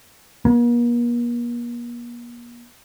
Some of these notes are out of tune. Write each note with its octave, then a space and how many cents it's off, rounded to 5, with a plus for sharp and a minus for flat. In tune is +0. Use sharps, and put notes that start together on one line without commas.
A#3 +45